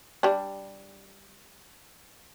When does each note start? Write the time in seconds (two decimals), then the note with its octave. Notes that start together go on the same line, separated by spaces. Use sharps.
0.23 G3 D4